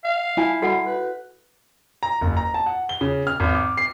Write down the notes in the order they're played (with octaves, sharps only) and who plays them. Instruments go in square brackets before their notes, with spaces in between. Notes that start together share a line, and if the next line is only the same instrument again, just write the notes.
[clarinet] F5
[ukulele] E4 G#5 A5
[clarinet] G3 [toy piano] F#4 A4 F#5
[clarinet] B4
[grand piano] A#5
F#1
A#5
A5
F#5
G7
C#3
F6
G#1
D6
C7